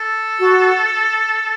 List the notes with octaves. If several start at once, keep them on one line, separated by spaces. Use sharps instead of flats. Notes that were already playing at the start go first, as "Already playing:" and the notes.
Already playing: A4
F#4